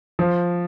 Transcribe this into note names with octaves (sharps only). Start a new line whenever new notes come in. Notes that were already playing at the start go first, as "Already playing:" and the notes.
F3